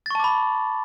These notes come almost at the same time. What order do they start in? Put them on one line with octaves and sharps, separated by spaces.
A6 C#6 A5 D6 B5